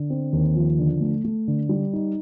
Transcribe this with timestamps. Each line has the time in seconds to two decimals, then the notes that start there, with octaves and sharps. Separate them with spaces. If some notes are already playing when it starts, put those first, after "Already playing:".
Already playing: D3
0.10 C4
0.33 D#2
0.55 F3
0.79 D3
1.01 A3
1.24 A3
1.48 D3
1.69 G3
1.93 D#4